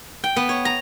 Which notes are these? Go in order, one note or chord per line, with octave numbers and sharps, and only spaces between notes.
G5
B3
C#5
A#5